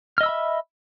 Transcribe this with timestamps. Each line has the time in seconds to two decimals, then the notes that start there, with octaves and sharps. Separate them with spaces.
0.18 F6
0.21 D#5
0.23 E6
0.26 B5
0.29 E5